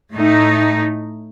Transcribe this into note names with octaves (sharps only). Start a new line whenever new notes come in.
A2 A3 D#4